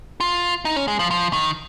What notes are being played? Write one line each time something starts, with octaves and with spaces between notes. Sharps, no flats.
F4
D#4
C#4
G#3
F3
F3
D#3